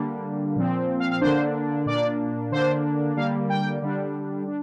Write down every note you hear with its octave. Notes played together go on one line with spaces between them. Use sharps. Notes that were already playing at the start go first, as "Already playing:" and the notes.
Already playing: D3 G3 A#3 D4
A#2 F3 C4
F5
F5
D3 A#3 D4 C5
A#2 A#3 D4 D5
D3 A#3 D4 C5
D3 G3 A#3 F5
G5
D3 G3 D4
D4